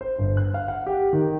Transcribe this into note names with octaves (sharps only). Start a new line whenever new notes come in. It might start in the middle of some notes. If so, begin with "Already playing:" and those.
C5
G1
F#6
F5
F#5
G4
D#3